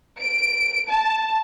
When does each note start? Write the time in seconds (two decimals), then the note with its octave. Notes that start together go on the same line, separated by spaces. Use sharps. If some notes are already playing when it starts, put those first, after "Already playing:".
0.19 D7
0.89 A5